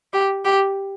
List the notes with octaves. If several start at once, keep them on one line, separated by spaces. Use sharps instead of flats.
G4
G4